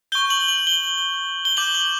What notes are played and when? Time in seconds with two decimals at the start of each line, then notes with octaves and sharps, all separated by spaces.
0.12 C#6 G6 G7
0.30 F#7
0.48 F#7
0.67 G7
1.45 G7
1.57 D6 G6 F#7
1.75 F#7